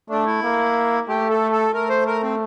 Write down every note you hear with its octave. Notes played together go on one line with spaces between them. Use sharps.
A3 D4
E4
A#3
A3 G4
A4
A4
A3 A#4
C5
A#4
C4